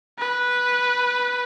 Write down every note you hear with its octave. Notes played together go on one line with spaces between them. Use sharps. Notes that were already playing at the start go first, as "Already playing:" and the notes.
B4